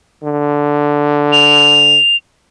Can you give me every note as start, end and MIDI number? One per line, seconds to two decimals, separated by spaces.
0.23 1.98 50
1.32 2.16 101